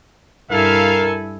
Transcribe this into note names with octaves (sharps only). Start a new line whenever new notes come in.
G2 E4 A4 A#4 E5 F5 G#5